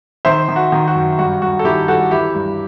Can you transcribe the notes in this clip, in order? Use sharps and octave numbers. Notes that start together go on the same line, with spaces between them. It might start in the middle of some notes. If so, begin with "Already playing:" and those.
D#3 C5 E5
D#3
F#4
D#3
F#4
F#2
G2 F#4
G2 F#4
A4
D#3 E4 G4
G2 F#4 A4
E3 E4 G4
G2